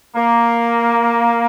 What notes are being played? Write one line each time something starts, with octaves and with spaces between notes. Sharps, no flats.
A#3